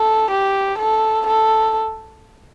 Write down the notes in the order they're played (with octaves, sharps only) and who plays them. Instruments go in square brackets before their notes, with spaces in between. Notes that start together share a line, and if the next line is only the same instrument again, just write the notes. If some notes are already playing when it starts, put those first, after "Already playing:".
Already playing: [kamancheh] A4
G4
A4
A4